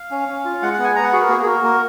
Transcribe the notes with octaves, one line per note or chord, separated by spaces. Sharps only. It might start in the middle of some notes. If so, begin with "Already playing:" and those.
Already playing: F5
C#4
C#4
F4
G#3 F#5
F#5
B3
G#5
B3 A#5
F#5
F#4 G#4
A#4
A#3 G#4
G#4
F#4 A#4
A#3 A#4